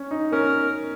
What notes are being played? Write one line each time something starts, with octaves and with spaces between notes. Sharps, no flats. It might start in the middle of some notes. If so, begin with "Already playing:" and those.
Already playing: C#4
D#4
C#4 A#4